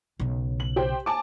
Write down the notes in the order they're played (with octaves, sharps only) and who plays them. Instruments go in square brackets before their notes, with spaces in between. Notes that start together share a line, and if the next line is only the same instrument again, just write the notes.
[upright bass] B1 C#3
[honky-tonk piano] F#7
G4 C5 G5
G#5 A5 D6